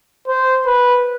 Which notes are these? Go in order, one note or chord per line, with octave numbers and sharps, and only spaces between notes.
C5
B4